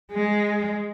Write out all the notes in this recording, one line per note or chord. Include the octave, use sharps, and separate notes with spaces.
G#3